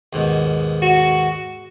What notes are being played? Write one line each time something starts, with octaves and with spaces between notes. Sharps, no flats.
D#2 G#2 B2
F#4